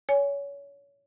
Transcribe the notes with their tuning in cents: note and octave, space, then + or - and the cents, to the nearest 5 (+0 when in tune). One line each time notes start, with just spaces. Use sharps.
C#5 +25 G#5 +0